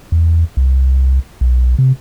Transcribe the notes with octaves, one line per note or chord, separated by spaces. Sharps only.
E2
C2
B1
C3